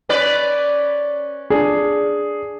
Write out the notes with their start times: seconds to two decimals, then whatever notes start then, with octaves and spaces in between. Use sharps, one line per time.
0.09 C#4 B4 D5
1.50 D4 G#4